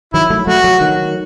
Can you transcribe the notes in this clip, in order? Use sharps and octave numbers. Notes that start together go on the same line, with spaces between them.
D#3 F#3 E4
F#3 A3
F#3 A3 F#4
F#3 A3
D#3 F#3